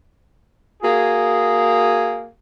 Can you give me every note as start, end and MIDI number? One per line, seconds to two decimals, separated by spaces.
0.82 2.28 58
0.82 2.28 66
0.82 2.28 68